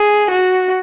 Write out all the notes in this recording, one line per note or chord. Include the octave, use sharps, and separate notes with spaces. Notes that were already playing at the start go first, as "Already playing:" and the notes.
Already playing: G#4
F#4